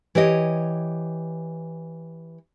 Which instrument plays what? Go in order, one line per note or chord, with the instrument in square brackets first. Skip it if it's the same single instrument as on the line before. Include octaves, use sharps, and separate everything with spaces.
[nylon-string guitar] E3 G4 C#5 D#5